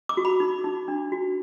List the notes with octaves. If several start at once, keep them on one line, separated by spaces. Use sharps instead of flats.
D6
F#4
B5
D#4
D#4
D4
F#4